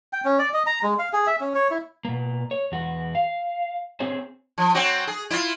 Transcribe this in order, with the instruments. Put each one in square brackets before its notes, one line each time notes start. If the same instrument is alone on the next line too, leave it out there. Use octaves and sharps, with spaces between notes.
[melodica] G5
C#4
D5
D#5
A#5
G#3
F5
G#4
E5
C#4
C#5
E4
[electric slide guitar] B2 A#3
C#5
E2 F#4
F5
C4 F#4 G#4 C5 C#5
[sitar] F3
F#3 C4 F#4
G#4
E4 F4